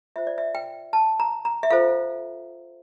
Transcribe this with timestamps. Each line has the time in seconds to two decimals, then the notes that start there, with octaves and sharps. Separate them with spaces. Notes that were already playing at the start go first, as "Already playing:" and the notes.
0.16 F4 C5 E5
0.27 D5
0.38 E5
0.55 G5
0.93 A5
1.20 A#5
1.45 A#5
1.63 E5
1.70 F4 A4 C5 F5